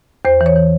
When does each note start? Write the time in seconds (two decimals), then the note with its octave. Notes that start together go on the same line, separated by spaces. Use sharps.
0.25 E2 C5
0.41 E3
0.46 C#5
0.56 E3